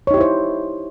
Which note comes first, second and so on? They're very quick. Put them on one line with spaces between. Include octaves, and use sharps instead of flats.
C#5 D#4 G4 E4 C5